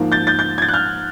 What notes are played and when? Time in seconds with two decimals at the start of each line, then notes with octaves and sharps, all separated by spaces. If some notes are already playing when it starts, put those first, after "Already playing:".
Already playing: G#2 F3 A#3
0.12 G6 A6
0.27 G6 A6
0.39 G6 A6
0.58 G#6
0.62 G6 A6
0.68 F#6
0.74 F6 G6